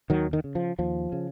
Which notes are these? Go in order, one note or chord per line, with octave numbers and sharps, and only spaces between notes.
D#2 D#3 F#3
D#3
C#3
F3
D#2 F3
C#3